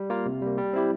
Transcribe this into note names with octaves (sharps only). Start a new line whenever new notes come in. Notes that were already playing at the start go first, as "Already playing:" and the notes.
Already playing: G3
A#3 F4 A#4
C3
G3 A#3
G3
C4 E4 G4